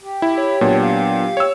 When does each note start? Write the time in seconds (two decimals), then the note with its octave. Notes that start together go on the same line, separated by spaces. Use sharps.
0.02 G4
0.22 E4
0.38 C#5
0.61 A#2 F#3 B3 D4
0.83 F5
1.37 C#5 E6